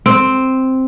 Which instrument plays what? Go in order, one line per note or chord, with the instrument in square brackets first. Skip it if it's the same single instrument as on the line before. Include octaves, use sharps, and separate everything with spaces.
[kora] C4